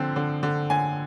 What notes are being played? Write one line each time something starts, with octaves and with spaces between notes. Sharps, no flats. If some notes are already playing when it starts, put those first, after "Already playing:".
Already playing: D3 F3 C4
D3
D3
D3 G#5